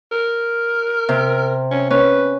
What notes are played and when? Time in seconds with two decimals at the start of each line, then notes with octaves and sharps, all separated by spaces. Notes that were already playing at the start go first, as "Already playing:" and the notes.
0.12 A#4
1.09 C3
1.71 C#4
1.90 C#4 B4